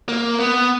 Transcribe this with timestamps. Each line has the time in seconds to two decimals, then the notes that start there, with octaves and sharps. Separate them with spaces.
0.09 A#3
0.39 B3